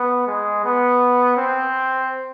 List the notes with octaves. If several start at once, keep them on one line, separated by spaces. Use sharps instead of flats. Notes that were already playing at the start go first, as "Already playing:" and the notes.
Already playing: B3
G#3
B3
C4